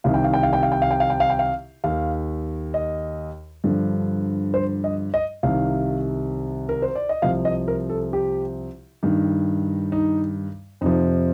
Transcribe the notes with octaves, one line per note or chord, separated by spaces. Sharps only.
C2 C3 D#3 F5
G5
F5
G5
F5
G5
F5
G5
F5
G5
F5
G5
F5
G5
F5
D#2 F5
D#3
D#5
G2 D3 F3
C5
D#5
D#5
C2 C3 D#3 F5
A#4
C5
D5
D#5
C2 C3 F3 F5
D#5
A#4
A4
G4
G2 D#3
D#4
F2 C3 F3 D#4